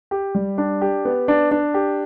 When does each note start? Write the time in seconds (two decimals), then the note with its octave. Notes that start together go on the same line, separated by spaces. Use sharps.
0.11 G4
0.35 G3
0.58 D4
0.81 G4
1.05 B3
1.28 D4
1.51 D4
1.74 G4